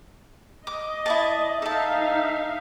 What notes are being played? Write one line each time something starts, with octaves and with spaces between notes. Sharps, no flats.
D#5 D6
E4 D5 A5
D#4 A4 E5 F5 A5